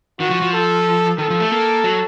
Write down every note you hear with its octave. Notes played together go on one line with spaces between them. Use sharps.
D#3 F#4
F3
F3
A4
D#3 A4
F3
A3
A#3
F#3